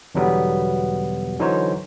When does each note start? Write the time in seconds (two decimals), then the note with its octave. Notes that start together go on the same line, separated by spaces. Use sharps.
0.15 E2 B2 D3 F#3 G3 B3
1.39 D3 E3 F#3 D#4 C5 C#5